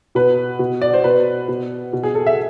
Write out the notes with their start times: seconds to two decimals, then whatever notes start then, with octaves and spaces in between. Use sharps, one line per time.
0.15 B2 B4
0.59 B2
0.81 D5
0.94 C5
1.04 B2 B4
1.48 B2
1.93 B2
2.03 G#4
2.15 A4
2.26 E5